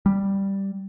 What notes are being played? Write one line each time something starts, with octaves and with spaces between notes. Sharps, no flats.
G3